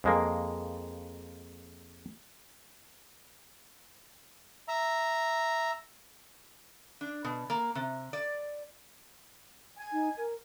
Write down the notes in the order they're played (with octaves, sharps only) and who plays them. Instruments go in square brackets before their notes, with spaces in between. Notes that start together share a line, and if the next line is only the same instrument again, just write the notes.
[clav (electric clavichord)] F2 G#3 A#3
[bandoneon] E5 A#5
[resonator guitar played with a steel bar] D4
B2
A#3
C3
D5
[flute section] G#5
[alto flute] D#4
A#4